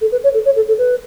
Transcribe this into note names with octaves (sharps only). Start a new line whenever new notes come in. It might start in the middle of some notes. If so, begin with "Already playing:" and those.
A4
B4
C#5
A4
C#5
A4
A4
B4